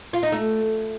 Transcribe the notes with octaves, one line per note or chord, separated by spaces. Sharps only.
F4
D#4
A3